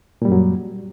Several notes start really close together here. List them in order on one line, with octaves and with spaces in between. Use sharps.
A#2 G3 F#2 F#3